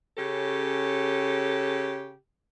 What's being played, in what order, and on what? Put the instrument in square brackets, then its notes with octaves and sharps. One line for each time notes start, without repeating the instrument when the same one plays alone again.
[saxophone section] C#3 C#4 G4 A4